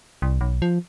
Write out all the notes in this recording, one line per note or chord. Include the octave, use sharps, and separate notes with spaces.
C2
B1
F3